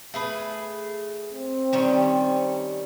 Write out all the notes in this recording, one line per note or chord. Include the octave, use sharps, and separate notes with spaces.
A3 G#4 B4
C4
D#3 G3 C#4